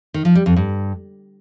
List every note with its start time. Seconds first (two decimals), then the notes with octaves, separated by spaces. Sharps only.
0.14 D#3
0.25 F3
0.35 G3
0.46 F2
0.56 G2